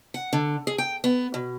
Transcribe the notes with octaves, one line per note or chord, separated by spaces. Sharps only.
F#5
D3
G#4
G5
B3
B2